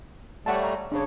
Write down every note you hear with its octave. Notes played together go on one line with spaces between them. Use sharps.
G3 A3 C#5 F#5 A5
F5 A#5
C#3 D4 C#5